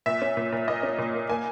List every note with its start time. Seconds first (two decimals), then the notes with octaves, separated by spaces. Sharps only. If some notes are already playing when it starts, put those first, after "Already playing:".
0.06 A#2 E5
0.22 C#4
0.37 A#2
0.52 A#2
0.68 A#3 D#5
0.83 C#4
0.98 A#2
1.14 A#3
1.29 A#3 G#5